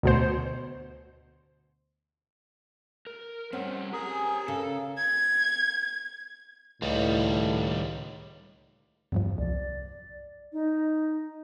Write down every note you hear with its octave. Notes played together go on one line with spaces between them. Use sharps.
D2 B2 C5
A#4
G3 C4 C#4 C5 F#5
G4 G#4 A#4 G#5
C#3 A4
G#6
C#2 A2 D#3 G3
E2 G2 F3
C2 D5
D#4